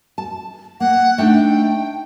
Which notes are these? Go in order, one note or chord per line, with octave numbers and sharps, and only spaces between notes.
A5
A#3 F#5
A3 D4 D#4 G5